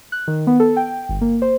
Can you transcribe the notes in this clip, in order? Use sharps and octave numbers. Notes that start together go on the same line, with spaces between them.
F#6
D#3
B3
A4
G5
G1
A#3
C5